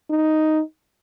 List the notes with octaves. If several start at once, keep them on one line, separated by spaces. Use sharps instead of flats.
D#4